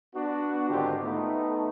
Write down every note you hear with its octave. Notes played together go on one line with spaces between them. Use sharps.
B3 D4 F#4
G#2 D3 D#3 C4 F4 G4
A3 B3 D#4